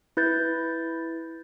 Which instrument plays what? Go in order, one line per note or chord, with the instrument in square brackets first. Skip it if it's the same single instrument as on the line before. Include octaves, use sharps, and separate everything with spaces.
[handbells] E4 B4 G6 A6